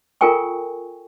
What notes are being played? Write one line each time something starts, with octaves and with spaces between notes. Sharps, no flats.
F4 A4 A#4 G5 G#5 C#6